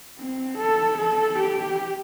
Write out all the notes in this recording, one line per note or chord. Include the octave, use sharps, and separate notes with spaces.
C4
A4
A4
G4